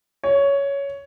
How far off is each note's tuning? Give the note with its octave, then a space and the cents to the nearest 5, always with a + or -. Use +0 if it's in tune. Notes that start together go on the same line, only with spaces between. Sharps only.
C#5 +10